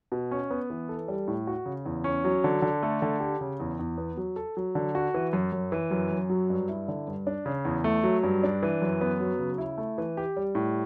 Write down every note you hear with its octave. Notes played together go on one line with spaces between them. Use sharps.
B2
C#4
B3
E3
A4
G3
A2
F#4
C#3
E2
C#4
F#3
D3
D3
A3
D3
G4
C#3
E2
E2
B3
F#3
A4
F#3
D3
F#4
E3
F#2
F#2
E3
F#2
F#2
F#3
G2
E4
D3
G2
D4
C#3
E2
A3
F#3
G2
D4
E3
F#2
B3
F#3
C#3
E4
A3
E3
G4
G3
A2